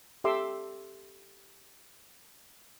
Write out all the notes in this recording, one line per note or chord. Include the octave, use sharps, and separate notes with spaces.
G4 A4 E5 C6 D6 E6